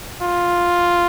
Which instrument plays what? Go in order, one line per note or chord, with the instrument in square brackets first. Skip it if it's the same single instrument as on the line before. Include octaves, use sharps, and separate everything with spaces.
[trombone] F4